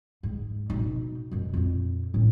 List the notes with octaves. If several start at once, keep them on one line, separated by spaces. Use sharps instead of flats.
G#2
B2 D#4
F#2 B2
F2 A#2
A2 C#4